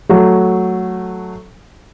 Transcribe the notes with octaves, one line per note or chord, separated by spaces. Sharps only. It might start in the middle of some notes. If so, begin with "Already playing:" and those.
F#3 A3